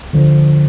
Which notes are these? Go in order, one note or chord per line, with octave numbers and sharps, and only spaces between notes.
D3 F3